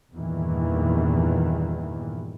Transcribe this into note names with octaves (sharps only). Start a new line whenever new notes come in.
E2 G2 A#2 D#3 E3